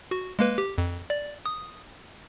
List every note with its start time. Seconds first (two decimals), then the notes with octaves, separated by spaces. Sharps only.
0.11 F#4
0.39 G#3 A#3 B4
0.58 G4
0.78 F2
1.10 D5
1.46 D#6